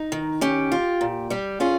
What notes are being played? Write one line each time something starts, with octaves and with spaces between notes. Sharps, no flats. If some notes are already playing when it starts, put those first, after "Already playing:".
Already playing: D#4
D#3
C#4 G4
F4
A#2
G3 G4
C#4 F4 G#4